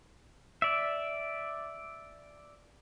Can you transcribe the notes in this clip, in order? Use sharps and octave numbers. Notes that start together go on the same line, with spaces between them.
D5 E5